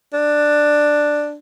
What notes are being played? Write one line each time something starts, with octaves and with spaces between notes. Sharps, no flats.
D4